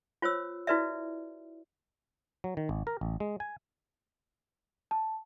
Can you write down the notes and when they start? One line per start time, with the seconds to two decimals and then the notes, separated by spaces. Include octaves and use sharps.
0.22 F4 C5 C#5 E6
0.67 E4 F#4 B4 D5 E5
2.44 F#3
2.57 D#3
2.69 G#1
2.87 A#4
3.01 A1
3.20 G#3
3.40 G#5
4.91 A5